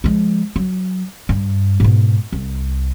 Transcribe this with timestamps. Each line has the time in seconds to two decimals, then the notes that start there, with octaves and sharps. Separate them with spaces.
0.04 F3 G#3
0.56 F#3
1.29 G2
1.80 G#2 B2
2.32 C2